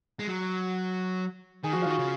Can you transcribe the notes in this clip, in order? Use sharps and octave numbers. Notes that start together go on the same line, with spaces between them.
G#3
F#3
D#3 G#4
F3 F#4
F4
D#3 F#4
C#3